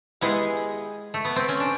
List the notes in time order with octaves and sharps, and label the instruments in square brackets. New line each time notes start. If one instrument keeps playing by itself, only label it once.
[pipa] G3 B3 E4 G#4 [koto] G#3
[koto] A3
B3
C4
C#4
D4